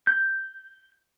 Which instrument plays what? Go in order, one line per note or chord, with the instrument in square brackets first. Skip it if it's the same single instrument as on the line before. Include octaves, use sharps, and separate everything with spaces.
[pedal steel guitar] G6